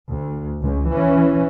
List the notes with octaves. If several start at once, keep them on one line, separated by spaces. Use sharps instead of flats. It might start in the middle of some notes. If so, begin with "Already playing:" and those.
D2
C#2
E3 C#4